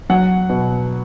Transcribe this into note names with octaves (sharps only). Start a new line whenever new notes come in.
F#3 F#5
B2